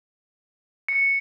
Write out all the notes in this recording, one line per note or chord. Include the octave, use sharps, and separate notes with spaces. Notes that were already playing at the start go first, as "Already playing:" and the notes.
C#7